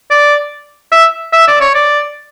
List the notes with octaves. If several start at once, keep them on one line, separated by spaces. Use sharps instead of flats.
D5
E5
E5
D5
C#5
D5